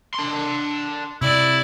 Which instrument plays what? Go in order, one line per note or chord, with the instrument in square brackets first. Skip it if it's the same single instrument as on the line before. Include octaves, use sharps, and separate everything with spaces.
[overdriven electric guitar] D4 C6
[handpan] C3 [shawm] E4 [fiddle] D5